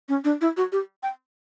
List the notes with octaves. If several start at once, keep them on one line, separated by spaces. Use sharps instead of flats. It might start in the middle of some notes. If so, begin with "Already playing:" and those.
C#4
D4
E4
F#4
G4
G5